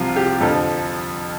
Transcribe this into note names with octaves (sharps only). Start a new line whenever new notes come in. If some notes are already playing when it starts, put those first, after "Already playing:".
Already playing: C2 C3 F3 F4
G4
F2 D3 F3 A4